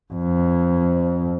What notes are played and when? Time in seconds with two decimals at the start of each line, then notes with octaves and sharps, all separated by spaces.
0.13 F2